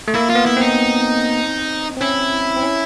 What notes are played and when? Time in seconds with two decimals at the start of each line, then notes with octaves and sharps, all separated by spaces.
0.08 A3
0.14 A#3 E4
0.30 F4
0.35 B3
0.46 E4
0.57 C4 D#4
1.97 C4
2.01 C#4 E4
2.57 C4
2.63 C#4